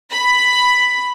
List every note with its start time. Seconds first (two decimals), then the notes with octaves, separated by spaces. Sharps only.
0.11 B5